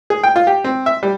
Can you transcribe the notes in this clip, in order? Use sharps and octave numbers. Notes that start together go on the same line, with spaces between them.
G#4
G5
F4
G4
C4
E5
G3